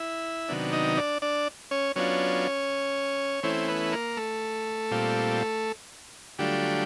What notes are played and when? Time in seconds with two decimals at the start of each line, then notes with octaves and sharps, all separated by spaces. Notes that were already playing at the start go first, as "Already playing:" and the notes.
Already playing: E4 E5
0.48 C3 D#3 F#3 B3 D4
0.73 D#4 D#5
0.97 D4 D5
1.22 D4 D5
1.71 C#4 C#5
1.96 F#3 B3 C#4 D4 F4 C#5
3.43 E3 A3 C4 C#4 E4 C5
3.68 B3 B4
3.92 A#3 A#4
4.17 A3 A4
4.91 A#2 G3 C4 F4
6.39 D3 F#3 G3 A3 D4 F4 G4